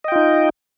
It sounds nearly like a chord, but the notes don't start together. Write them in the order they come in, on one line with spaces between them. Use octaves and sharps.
D#5 G5 F4 D#4